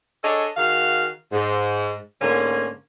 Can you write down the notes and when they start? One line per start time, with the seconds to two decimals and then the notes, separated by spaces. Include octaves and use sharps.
0.23 D4 G#4 A4 C#5 D#5
0.57 D#3 F#4 G#4 F5
1.32 G#2
2.21 G#2 D3 A3 A#3 C#4